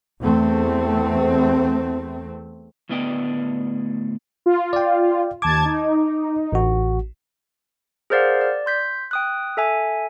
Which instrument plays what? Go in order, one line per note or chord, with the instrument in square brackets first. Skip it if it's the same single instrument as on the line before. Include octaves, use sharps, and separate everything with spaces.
[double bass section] E2 A3 C4
[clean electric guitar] D2 A2 B3 D4 D#5 G5
[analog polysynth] F4
[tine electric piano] D5 G5
[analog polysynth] D#2 A5 G#6 [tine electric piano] D6
[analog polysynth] D#4
[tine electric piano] A1 F#4
[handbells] G#4 A#4 C5 D5 F5 F#5
D5
C6 G6 B6
G5 D#6 F#6
A4 E5 G#5